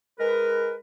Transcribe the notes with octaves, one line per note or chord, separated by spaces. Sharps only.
G#3 A#4 B4